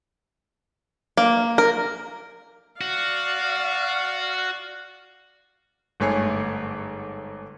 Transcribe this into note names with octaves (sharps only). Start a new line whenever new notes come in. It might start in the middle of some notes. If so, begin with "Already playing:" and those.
A#3
A#4
F#4 D5 F5
G1 G#2 A3 C#5 G#5 C7